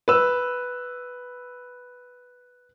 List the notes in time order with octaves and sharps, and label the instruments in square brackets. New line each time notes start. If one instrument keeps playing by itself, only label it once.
[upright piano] B4 E6